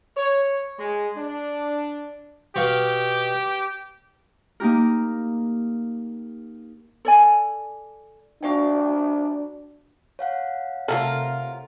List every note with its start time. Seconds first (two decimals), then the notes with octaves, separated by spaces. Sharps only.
0.16 C#5
0.79 G#3
1.17 D4
2.56 B2 G4 F5
4.60 A#3 D#4 G4 A#4
7.05 A4 D5 G#5
8.43 D4 F#4 F5 G5
10.19 C#5 F5 F#5
10.88 C3 A3 F4 A4 A#4